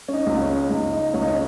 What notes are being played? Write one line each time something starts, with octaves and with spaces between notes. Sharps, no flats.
C#4
D#4
C#2
C#4
C#2 D#4
D#4
C#2 C#4
D#4
C#4